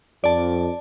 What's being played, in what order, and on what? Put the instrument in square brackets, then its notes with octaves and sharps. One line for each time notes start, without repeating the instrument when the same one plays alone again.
[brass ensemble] F2 [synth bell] D5 A5